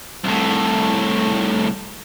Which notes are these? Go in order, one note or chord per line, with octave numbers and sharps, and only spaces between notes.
C2 A2